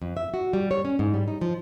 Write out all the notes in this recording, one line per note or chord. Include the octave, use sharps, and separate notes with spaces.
F2
E5
F#4
G3
C#5
C#4
G#2
G3
D#4
F3